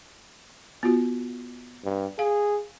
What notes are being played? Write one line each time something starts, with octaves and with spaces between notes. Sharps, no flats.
B3 F4 F#4
G2
G#4 F5